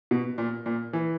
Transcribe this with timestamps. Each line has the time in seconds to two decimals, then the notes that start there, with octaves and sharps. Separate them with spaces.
0.11 B2
0.38 A#2
0.66 A#2
0.93 E3